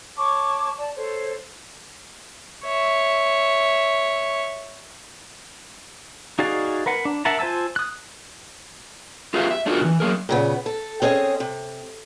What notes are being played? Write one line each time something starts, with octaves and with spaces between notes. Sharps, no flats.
C#5 A5 C#6 D6
D5 A5
A4 C5 C#5
C#5 E5
D#4 F#4 G#4 D5 F5
A#4 B4 F#5
D4
A#4 E5 F#5 A5 A#5
F4 C5 G#5 A5 E6
D#6 F#6
F4 G4 G#4 B4 E5 F5
E5
D4 D#4 F4 F#4 G#4 A#4
B2 E3
F#3 A#3 G#4 A#4
A#2 C#3 B3
A4
C4 C#4 G#4 B4 D#5
C3